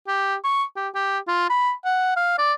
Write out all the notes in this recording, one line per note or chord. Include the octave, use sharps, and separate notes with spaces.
G4
C#6
G4
G4
F4
B5
F#5
F5
D5